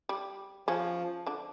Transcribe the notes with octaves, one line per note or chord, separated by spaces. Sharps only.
G3
C#3 F3 C#4
D3 D4